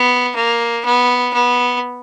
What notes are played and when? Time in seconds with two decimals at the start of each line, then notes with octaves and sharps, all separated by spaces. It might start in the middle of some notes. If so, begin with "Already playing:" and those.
Already playing: B3
0.35 A#3
0.85 B3
1.33 B3